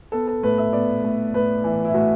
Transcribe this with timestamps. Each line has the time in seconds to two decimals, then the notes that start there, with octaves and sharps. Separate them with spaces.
0.12 B3 A4
0.27 A4
0.43 A2 B4
0.58 E5
0.73 B3 D5
1.04 A2
1.34 A2 B4
1.64 E3
1.85 E4
1.94 A2 F#4